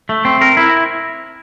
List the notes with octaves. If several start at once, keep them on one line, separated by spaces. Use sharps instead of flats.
A3
C4
A#4
E4